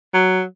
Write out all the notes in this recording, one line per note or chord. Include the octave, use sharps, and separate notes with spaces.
F#3